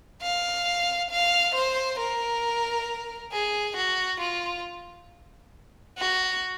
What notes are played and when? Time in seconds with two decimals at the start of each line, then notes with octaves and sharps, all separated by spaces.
0.22 F5
1.10 F5
1.55 C5
1.99 A#4
3.32 G#4
3.76 F#4
4.20 F4
5.98 F#4